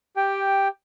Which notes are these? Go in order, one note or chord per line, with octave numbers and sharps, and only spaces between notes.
G4 G5